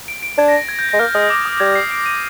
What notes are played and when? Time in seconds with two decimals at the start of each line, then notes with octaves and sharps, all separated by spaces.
0.08 D7
0.23 D7
0.38 D4 G#6
0.48 A#6
0.69 G#6
0.79 G6
0.89 A#6
0.93 G#3
0.99 A#3 F6
1.14 G#3 D#6
1.30 D6
1.46 D#6
1.60 G3 G#6
1.75 C7
1.91 D7
2.06 D#7